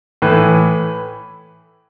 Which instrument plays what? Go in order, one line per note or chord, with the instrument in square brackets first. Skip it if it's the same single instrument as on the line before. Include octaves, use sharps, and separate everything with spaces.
[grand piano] A2 E3 B4